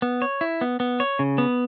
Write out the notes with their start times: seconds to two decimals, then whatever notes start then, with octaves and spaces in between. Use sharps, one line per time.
0.02 B3
0.22 C#5
0.41 E4
0.61 B3
0.80 B3
1.00 C#5
1.19 C#3
1.38 B3